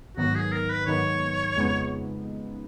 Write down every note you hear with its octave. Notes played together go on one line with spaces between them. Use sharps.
G#2 D#3 F#3 B3 D#4 F#4
G#4
A#4
B4
G#2 D#3 F#3 B3 D#4 C#5
F2 C#3 G#3 B3 D#4